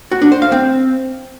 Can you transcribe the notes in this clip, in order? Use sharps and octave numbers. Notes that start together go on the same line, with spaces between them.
F#4
D4
C5
F5
C4